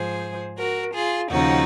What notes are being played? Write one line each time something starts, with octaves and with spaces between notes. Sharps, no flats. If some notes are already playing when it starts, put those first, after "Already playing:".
Already playing: G#2 F3 G#4 C5
F#4 A#4
F4 G#4
D#2 C#3 F3 D#4 F#4